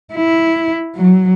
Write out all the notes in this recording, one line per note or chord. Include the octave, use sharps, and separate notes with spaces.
E4
F#3